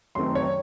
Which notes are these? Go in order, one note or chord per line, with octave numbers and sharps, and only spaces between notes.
F#2 D#3 A3 C4 C6
C#5